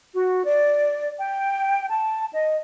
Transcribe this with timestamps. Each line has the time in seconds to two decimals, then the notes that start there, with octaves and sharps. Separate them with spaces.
0.14 F#4
0.45 D5
1.19 G5
1.90 A5
2.33 D#5